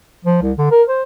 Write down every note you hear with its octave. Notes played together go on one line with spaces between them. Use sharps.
F3
C2
D3
A#4
C5